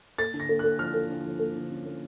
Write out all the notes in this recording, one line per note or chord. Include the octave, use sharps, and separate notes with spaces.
A#3 A6
D3
A#6
A#3
A#3 F#6
F3 F6
A#3
D3
F3
A#3
D3
C#4
A#3